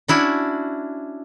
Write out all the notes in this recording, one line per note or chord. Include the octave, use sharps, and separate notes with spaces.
C#4 D4 E4 F#4